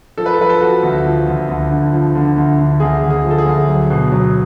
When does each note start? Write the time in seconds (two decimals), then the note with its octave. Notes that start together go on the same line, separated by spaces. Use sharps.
0.18 F3 A4
0.26 B4
0.34 A4
0.39 F3 B4
0.50 A4
0.61 F3 F#4
0.83 D2
1.05 F3
1.27 D2
1.48 D2
1.71 D3
1.93 F3
2.15 D3
2.37 D2
2.59 D3
2.80 D2 G#4
3.03 D2
3.10 G#4
3.25 F3
3.31 A4
3.38 G#4
3.46 D2
3.68 F#3
3.91 B2
4.12 F#3